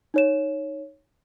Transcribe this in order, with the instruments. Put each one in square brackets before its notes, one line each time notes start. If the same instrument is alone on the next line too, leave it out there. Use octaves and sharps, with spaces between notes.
[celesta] D#4 C#5 E7